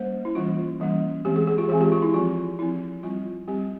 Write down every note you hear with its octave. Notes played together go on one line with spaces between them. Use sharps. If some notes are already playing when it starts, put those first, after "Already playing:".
Already playing: G3 A#3 C#4 C5
E4
E3 G3 A#3 C#4 F4
E3 G3 A#3 C#4
E3 G#3 C4 G4
G#4
G#4
F4
E3 G#3 C4 G#4
G4
F4
E4
F3 C4 F4
F3 C4 E4
G3 C4 F4
G3 C4 G4